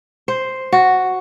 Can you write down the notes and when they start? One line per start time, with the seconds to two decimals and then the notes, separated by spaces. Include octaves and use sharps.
0.28 C5
0.72 F#4